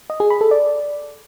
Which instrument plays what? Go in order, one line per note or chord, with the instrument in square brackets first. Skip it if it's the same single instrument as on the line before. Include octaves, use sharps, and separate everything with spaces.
[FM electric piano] D#5
G#4
B5
A4
D5